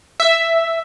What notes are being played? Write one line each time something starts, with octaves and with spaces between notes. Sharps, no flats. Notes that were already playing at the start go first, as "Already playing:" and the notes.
E5